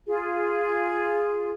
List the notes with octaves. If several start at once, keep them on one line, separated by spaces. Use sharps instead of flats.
F4 G#4